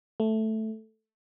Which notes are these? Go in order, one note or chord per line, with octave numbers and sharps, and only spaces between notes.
A3